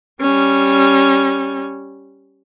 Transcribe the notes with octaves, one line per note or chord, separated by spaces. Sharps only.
G3 C#4